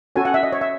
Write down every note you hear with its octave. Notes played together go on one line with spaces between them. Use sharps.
C#4 F#4 A4 C#5 G#5
F#5
E5
D#5
C#5
E5